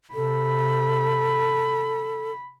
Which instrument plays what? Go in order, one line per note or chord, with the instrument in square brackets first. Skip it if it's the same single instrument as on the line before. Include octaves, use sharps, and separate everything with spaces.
[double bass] C3 [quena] A4 [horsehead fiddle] B5